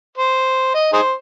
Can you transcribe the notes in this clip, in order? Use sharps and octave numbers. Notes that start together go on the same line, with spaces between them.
C5
D#5
D#4 G#4 C5